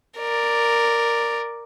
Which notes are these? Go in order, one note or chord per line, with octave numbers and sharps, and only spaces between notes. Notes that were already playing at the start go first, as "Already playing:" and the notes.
A#4 D5